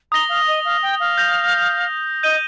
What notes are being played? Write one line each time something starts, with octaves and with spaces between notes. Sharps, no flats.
A#5 D#6 A#6 G7
F5
D#5
F5
G5
F5
G6 A#6 F7
D#5 G6 D#7 G7